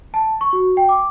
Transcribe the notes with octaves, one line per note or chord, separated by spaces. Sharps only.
A5
C#6
F#4
G5
D6